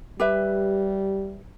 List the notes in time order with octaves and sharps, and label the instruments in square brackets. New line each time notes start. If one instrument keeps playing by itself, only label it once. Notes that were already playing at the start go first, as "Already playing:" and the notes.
[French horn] G3 [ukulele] G4 B4 E5